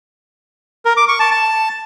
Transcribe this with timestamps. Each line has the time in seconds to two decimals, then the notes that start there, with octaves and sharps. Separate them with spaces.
0.85 A#4
0.97 D6
1.08 C#6
1.20 A5
1.31 A5